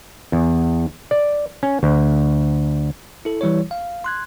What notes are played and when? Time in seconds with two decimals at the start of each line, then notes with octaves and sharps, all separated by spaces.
0.32 E2
1.11 D5
1.63 C#4
1.83 D2
3.25 E4 A4
3.41 E3 G3 E4 C#5
3.71 F5
4.04 C6 F#6 G#6